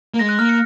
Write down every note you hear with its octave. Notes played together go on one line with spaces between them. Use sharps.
A#3
G#3 A#6
F#6
A#3 F6
C#7